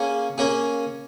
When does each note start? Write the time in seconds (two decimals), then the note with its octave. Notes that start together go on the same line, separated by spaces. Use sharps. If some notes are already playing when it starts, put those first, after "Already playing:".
Already playing: A#3 C#4 G#4
0.38 A#3 C#4 G#4